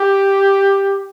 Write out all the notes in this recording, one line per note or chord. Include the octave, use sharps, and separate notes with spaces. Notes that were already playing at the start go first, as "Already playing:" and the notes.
Already playing: G4